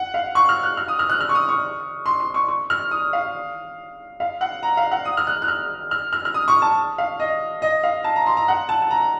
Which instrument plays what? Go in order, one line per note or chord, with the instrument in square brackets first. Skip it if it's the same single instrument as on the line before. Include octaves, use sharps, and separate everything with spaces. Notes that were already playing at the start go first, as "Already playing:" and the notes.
Already playing: [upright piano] F#5
F5
C#6
F6
F#6
F6
D#6
F6
F#6
F6
C#6
D#6
C#6
C6
C6
C#6
C#6
F6
D#6
F5
F5
F#5
A#5
F5
F#5
D#6
F6
F#6
F#6
F6
F6
F6
F6
D#6
C#6
A5
F5
D#5
D#5
F5
A5
A#5
C6
A#5
F#5
A5
A5
A#5